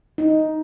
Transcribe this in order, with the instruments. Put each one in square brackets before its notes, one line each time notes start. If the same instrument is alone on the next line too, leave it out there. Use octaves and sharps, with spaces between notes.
[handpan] D#4